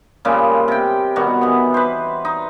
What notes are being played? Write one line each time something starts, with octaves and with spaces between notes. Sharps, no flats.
A#2 C#3 G3 G#3
C3 G5
B2 D#3 G3 F#4
E3 B3
B4 C5
D#4